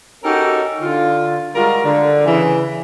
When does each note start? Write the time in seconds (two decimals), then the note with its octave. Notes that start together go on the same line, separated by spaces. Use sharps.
0.24 C#4 D#4 F#4 G4 A4 A#4
0.80 D3 F4
1.55 G3 G#3 F4 F#4 A#4
1.84 D3
2.26 C#3 E3